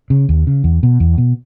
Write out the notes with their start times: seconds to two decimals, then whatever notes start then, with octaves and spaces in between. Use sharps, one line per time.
0.10 C#3
0.29 D#2
0.47 C#3
0.64 E2
0.83 B2
1.00 E2
1.18 B2